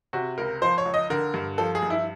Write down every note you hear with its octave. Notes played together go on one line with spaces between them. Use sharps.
C3 F#4
C#2 A#4
F3 C5
C#5
C#2
D#5
D3 A#4
G2
F3 A4
G#4
G2
E4